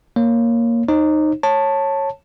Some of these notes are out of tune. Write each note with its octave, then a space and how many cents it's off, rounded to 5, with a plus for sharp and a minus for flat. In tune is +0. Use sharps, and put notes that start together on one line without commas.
A#3 +0 C#5 +0
D#4 -15 C5 +45
C#5 -15 A5 +5